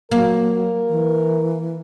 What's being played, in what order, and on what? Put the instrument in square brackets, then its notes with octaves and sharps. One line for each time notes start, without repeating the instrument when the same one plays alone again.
[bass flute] F#3 [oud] A#3 [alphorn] A#4
[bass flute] E3